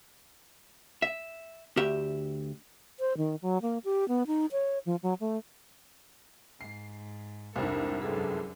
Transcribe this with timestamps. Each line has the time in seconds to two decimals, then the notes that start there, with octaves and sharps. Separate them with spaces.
1.02 E5
1.77 D2 G4 E5
3.00 C5
3.17 D#3
3.42 F#3
3.62 A#3
3.85 G4
4.08 B3
4.27 D#4
4.52 C#5
4.86 F3
5.03 F#3
5.20 A3
6.61 G#2 C7
7.56 C2 F2 G#2 D4 A4 A#4
8.02 F#2 D3 G#4 A4 B4